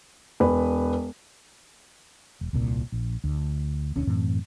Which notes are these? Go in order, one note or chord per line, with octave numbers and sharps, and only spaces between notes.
E1 B4
E1
D#1 C2 A#2
A#1
D2
E1 D2 C#4 D4
F#2 A2 E3 C4